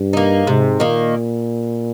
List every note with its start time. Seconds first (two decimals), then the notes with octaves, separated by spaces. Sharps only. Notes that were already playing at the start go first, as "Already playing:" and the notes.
Already playing: G2
0.13 A#3 D#4
0.46 G#2 C3
0.80 A#2 D#3 A#3